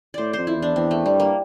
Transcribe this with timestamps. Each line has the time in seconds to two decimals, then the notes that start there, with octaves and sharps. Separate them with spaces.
0.14 A2 C5 D5
0.33 F2 C5
0.47 E4
0.57 E2
0.62 D4
0.76 E2 C4
0.91 A3
1.06 G2 G3
1.20 A#3